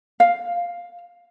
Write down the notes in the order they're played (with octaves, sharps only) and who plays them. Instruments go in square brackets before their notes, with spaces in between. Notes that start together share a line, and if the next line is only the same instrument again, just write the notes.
[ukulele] F5